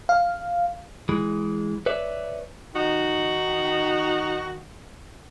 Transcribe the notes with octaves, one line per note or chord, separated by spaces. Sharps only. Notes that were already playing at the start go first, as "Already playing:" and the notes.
F5
E3 G#3
B4 C#5 D5 E5
D#3 D#4 F#4